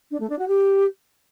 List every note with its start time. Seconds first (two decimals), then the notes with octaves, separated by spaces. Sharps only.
0.11 D4
0.20 A3
0.29 D4
0.39 F#4
0.48 G4